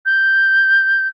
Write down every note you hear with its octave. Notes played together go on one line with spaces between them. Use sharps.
G6